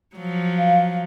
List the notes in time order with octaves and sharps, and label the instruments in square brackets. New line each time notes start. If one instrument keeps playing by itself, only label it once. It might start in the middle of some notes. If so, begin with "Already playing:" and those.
[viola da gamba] F3 F#3
[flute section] F5